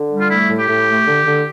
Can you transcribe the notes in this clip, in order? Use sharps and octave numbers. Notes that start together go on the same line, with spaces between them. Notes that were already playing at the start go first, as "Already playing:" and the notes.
Already playing: D3
G3
F4
A3 E4
A2
G4
A2
A3
D3
D3